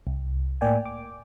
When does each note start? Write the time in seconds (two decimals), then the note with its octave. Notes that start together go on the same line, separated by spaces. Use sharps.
0.07 C2
0.61 A2 A#3 D5 G5 G#5
0.86 D6